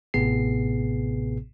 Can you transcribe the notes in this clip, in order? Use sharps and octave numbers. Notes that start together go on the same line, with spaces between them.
A1 A2 C3 B3 G#4 C7